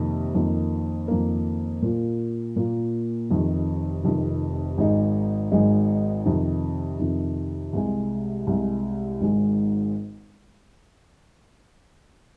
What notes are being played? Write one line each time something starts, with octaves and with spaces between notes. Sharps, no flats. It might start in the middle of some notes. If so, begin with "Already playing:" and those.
Already playing: F2 C3 D#3 A#3
F2 D#3 A#3
F2 D#3 A#3
A#2 A#3 F4
A#2 A#3 F4
F1 F2 C3 D#3
F1 F2 C3 D#3
G#1 G#2 G#3 D#4
G#1 G#2 G#3 D#4
F2 C3 D#3
F2 C3 D#3
C2 C3 G#3
C2 C3 G#3
G#1 G#2 G#3